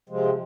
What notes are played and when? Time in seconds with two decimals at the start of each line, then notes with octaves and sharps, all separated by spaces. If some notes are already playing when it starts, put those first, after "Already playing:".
0.09 C3 F3 G#3 C4